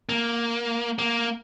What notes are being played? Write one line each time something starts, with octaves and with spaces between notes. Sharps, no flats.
A#3
A#3